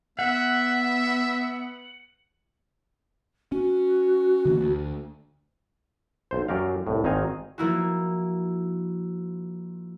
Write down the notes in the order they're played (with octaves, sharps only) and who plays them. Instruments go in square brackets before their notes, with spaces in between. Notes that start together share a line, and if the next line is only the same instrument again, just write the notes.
[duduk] B3 [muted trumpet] E5 [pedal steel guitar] F#5
[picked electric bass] C#4 [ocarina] F#4
[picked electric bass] D3 E3 A#3
D2
[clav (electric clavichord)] B1 C5
F#2 F#3 G4 A#4 D5 F5
C2 A2
G#1 D#3 C4 D#4 F5 G#5
[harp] F3 A#3 E4 F#4